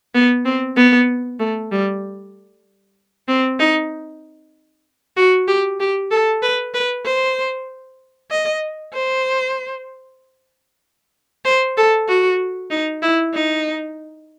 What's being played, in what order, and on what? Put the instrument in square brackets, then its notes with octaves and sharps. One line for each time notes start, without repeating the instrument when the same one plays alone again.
[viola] B3
C4
B3
A3
G3
C4
D#4
F#4
G4
G4
A4
B4
B4
C5
D#5
C5
C5
A4
F#4
D#4
E4
D#4